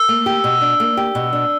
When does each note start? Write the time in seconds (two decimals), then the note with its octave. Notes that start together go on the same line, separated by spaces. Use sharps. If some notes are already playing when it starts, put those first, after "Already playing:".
Already playing: E6
0.09 A#3
0.26 G4
0.44 B2
0.61 D4
0.80 A#3
0.97 G4
1.15 B2
1.33 D4